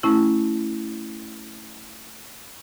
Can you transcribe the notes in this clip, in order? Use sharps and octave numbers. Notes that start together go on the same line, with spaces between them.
A3 C#4 E4